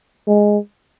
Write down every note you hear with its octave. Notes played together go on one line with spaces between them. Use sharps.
G#3